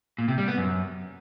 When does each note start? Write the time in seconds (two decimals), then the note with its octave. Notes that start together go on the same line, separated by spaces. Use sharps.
0.18 A#2
0.28 C3
0.38 G3
0.48 B3
0.57 F#2